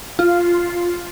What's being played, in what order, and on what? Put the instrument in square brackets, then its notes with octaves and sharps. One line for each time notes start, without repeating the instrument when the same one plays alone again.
[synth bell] F4